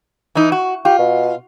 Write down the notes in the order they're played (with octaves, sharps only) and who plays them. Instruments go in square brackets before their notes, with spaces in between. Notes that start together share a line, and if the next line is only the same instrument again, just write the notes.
[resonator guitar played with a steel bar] E3 D#4
F#4
[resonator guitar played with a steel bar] F4 [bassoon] G4
[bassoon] B2